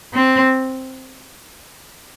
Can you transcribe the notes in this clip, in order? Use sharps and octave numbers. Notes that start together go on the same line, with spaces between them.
C4